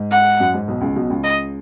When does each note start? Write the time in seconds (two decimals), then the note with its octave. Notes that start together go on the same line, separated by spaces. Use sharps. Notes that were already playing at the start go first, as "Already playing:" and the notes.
Already playing: G#2
0.11 F#5
0.40 F#2
0.54 G#2
0.68 B1 B2
0.81 C#2 C#3
0.96 B1 B2
1.10 C#2 C#3
1.24 D#5